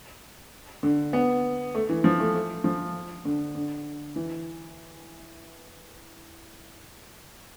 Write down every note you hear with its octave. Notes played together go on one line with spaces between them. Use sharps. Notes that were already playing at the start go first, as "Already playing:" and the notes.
D3
B3
A3
E3
F3
A3
A3
F3
D3
D3
E3